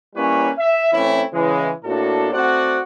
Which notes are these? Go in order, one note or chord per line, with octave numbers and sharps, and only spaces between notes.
G3 A#3 C#4 E4 B4 C#5
E5
E3 A3 C4 C#4 E4
C#3 E3 G#3
A2 A#3 D4 F#4 A4
A3 C4 F#4 C5 D5 F#5